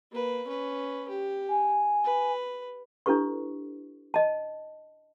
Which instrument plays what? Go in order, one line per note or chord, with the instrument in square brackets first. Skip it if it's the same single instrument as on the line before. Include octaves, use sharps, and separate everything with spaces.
[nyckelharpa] A#3 B4
C#4 B4
G4
[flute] G#5
[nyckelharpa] B4
[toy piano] D4 E4 G4 A4 B4 C#6
D#5 A5